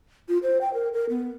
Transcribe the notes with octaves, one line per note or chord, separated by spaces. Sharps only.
F4
C5
G5
A#4
A#4
B3